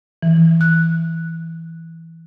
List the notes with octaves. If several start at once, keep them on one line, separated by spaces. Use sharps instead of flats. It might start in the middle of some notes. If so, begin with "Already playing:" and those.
E3
F#6